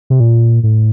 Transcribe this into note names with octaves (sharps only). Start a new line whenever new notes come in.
C3
A#2
A2